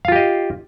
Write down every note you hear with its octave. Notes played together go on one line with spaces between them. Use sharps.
F4 G4 D#5 F5